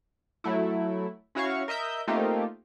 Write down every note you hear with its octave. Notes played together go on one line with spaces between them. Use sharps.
F#3 A3 E4
C#4 E4 F#4 C#5 F5 C#6
A#4 D#5 E5 G6
A3 A#3 C4 D#4 F4 G4